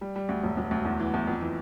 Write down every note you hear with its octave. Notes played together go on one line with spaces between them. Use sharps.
G3
G3
D2
E1
E1
D2
E2
E3
E2
F2
E3